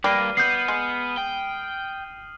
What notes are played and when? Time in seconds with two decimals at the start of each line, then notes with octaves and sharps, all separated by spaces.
0.04 G2 A#3 G4 B4 D5 F6 C7 D#7
0.37 B3 D#6 G6 C7 F#7
0.68 G#3
1.18 G5